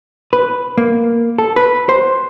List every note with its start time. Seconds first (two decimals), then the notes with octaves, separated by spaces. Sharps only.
0.33 B4
0.78 A#3
1.38 A4
1.56 B4
1.89 C5